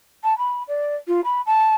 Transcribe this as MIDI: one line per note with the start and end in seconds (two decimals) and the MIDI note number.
0.23 0.36 81
0.38 0.63 83
0.68 0.95 74
1.07 1.20 65
1.24 1.41 83
1.46 1.75 81